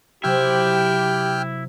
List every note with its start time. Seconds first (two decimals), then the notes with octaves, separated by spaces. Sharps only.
0.24 C3 F#3 C4 E4 G4 G5 F6